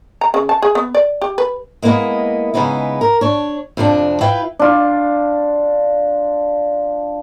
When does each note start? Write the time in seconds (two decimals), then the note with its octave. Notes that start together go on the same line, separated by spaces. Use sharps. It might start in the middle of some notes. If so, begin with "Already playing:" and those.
0.21 A#5
0.34 C#3
0.49 A5
0.62 G#4
0.75 B3
0.95 D5
1.21 G4
1.38 B4
1.82 G#3 A#3 B3 D#4 E4 D#5
2.54 C#3 G#3 B3 D#4 E4
3.01 A#4
3.21 D4 C#5
3.77 F2 C3 F3 D4
4.21 E4 F4 B4 G5
4.59 D4 F4